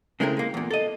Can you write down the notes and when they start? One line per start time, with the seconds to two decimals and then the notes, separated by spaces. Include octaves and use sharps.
0.20 C#3 G#3 A3 C4 E4 A#4
0.37 G#3 A#3
0.54 E2 A#2
0.71 A4 D#5